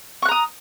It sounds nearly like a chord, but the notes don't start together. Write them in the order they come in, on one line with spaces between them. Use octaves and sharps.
C#6 F#6 A#5 D#6